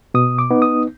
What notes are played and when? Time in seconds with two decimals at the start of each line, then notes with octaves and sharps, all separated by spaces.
0.14 B2 D#6
0.39 D6
0.51 B3 D#4
0.62 D#6